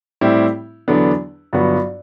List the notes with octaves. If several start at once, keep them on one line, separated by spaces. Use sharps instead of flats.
A2 G3 C4 E4 G4
E2 D3 F#3 B3 D4
G1 G2 F#3 B3 F#4